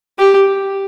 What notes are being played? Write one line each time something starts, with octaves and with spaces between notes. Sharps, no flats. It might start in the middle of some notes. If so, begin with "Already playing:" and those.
G4